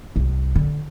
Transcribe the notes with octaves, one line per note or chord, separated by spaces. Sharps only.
C2
D3